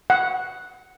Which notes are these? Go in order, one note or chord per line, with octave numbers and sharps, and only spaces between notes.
F#5